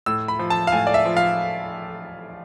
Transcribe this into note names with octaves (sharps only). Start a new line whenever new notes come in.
A2 E6
B5
F3
A5
F5
A2 G#5
D5
E5
F3
F5